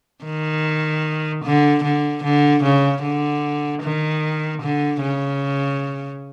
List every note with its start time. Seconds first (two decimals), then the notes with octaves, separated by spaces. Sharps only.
0.25 D#3
1.44 D3
1.84 D3
2.24 D3
2.63 C#3
3.03 D3
3.83 D#3
4.62 D3
5.02 C#3